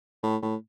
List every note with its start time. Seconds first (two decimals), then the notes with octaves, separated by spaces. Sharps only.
0.23 A2
0.42 A2